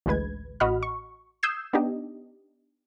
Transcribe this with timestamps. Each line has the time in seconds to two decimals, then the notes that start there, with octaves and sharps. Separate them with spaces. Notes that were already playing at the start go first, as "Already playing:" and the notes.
0.06 A1 D2 G#3 B4 G#6
0.60 A1 F#4 D#5 F#5 B5 F6
0.83 C#6
1.43 D#6 E6 G6 G#6 C7 E7
1.73 B3 D4 D#4 G4 D#5